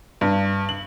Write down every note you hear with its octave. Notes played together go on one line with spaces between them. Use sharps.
G2
F#7